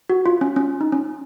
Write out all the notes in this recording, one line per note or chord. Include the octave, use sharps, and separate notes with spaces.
F#4
F4
C#4
C#4
D#4
C#4